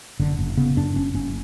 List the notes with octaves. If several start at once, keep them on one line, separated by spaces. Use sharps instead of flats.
F#1 D3
F#1
C#3 B3
F#2 D4
F#1 C#4
F#1 C#4